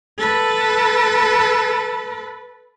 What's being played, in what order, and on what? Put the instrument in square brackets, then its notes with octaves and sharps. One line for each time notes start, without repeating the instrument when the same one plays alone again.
[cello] A4 B4